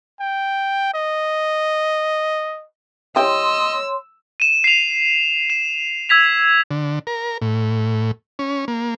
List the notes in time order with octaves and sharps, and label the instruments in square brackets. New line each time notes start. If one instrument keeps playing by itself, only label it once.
[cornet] G5
D#5
[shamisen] E3 G4 [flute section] C#5 C6 [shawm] D#5 [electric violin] E6
[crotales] D#7 E7
C7 F7
E7
E6 G#6 B6 F7
[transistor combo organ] D3
A#4
A2
C#4
A#3